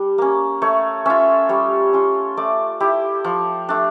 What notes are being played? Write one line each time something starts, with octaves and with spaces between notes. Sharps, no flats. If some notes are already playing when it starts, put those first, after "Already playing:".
Already playing: G3 D4
A#3 C#4
A3 C#5
C#4 F4 E5
G3 C#5
C#4 F4
A3 D5
E4 G4
F3
A3 D4